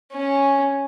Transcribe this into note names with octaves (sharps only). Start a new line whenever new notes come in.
C#4